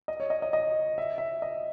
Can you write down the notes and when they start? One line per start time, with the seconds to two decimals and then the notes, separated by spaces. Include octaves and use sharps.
0.08 D#5
0.20 C#5
0.30 D#5
0.42 D#5
0.53 D#5
0.98 E5
1.18 E5
1.42 D#5